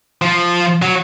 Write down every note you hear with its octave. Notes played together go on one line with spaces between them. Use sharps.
F3
F#3